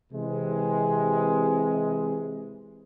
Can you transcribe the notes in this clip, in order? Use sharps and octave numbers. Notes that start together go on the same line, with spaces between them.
C3 E3 G#3